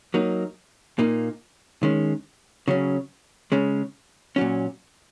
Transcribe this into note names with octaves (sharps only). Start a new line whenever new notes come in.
F#3 A#3 D#4
A#2 A#3 D#4
D#3 G#3 C#4
C#3 F#3 C#4
C#3 G#3 C#4
A#2 F#3 C#4